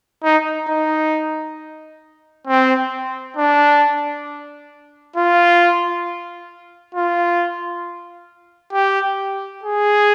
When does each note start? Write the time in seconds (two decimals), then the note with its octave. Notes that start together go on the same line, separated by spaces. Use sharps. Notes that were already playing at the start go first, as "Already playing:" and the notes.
0.24 D#4
0.68 D#4
2.47 C4
3.37 D4
5.16 F4
6.95 F4
8.73 G4
9.63 G#4